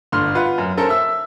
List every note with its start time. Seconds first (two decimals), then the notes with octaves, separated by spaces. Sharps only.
0.12 G1 D3 C6 F6
0.35 F4 B4 F#5
0.58 F#2
0.77 C#4 A4 A#4 C5
0.89 E5 E6